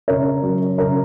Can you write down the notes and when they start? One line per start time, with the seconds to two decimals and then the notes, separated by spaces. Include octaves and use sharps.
0.08 C#3 A#4 C#5
0.43 F#3
0.78 C#3 A#4 C#5